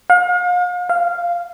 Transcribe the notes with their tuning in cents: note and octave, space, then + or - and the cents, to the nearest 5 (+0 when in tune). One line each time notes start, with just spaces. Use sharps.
F5 +40
F5 -10